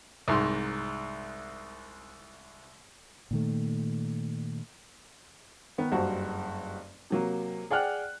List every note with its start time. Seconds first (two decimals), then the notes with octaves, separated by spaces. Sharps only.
0.28 C2 G#2 C6
3.31 A#2 D#3 A3
5.78 D#3 B3
5.92 F#1 G2 F#4 C5
7.10 C3 F#3 A#3
7.71 G#4 D5 F#5 G5 F6 F#6